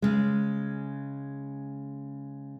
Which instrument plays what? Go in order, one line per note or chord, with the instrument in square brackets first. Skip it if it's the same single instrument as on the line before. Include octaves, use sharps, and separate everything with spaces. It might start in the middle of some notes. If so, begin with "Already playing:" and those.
[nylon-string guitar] C#3 G#3